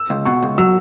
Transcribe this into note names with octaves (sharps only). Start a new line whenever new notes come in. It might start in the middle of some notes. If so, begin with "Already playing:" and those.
Already playing: E6
C#2
B2 C#6
C#2
F#3 E6